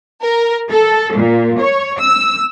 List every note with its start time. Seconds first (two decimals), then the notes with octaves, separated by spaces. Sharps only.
0.22 A#4
0.71 A4
1.15 A#2
1.60 C#5
2.00 E6